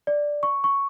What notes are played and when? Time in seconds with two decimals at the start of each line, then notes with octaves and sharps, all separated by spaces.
0.07 D5
0.43 C#6
0.64 C#6